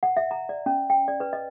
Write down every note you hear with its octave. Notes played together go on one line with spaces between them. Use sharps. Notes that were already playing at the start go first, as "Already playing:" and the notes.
F#5
E5
A#5
D5
C#4
G5
D5
B4
D#5